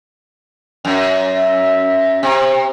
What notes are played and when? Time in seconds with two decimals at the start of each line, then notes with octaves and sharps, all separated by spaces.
0.85 F#2
1.35 E5
2.23 C3